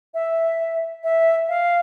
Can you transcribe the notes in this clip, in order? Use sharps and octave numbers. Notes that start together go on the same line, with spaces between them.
E5
E5
F5